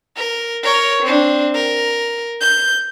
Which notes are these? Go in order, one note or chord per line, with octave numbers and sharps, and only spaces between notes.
A#4
A#4 C#5
C4 D4
A#4
G6